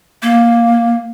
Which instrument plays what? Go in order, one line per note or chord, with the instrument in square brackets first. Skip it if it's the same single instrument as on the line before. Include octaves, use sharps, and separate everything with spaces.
[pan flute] A#3